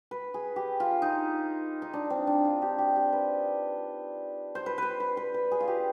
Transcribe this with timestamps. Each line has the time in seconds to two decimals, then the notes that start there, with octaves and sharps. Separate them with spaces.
0.11 B4
0.34 G#4
0.56 G4
0.80 F4
1.02 D#4
1.82 D#4
1.94 D4
2.10 C4
2.27 D4
2.45 F4
2.62 G4
2.78 G4
2.96 G4
3.13 B4
4.55 C5
4.66 B4
4.78 B4 C5
5.00 B4
5.17 B4
5.34 B4
5.51 G#4
5.60 F4
5.68 G4